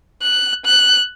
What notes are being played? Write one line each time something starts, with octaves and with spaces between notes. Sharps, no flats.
F#6
F#6